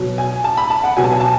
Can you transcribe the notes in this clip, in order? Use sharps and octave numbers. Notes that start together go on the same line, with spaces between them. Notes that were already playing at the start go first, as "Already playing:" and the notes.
Already playing: B2 F#3
G#5
A5
B5
A5
F#5
B2 F#3 G#5
A5
G#5
A5